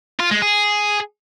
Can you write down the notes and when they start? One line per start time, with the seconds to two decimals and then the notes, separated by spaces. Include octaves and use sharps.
0.20 F4
0.31 G#3
0.42 G#4